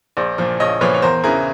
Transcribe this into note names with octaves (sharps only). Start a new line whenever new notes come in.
A#1 C5 D5
A#2 F3
A#1 C#5 D#5
A#2 F3 B4 C#5
C#5
E2 A#4 C5
C#3 E3 G#4 A#4